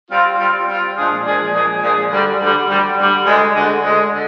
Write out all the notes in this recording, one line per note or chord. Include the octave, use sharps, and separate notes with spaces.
G3 C4 F4
G3 C4 F4
G3 C4 F4
A#2 F3 G#3 D4 G#4
A#2 F3 G#3 D4 G#4
A#2 F3 G#3 D4 G#4
A#2 F3 G#3 D4 G#4
D2 D3 G3
D2 D3 G3
D2 D3 G3
D2 D3 G3
D2 D3 G#3
D2 D3 G#3
D2 D3 G#3
D3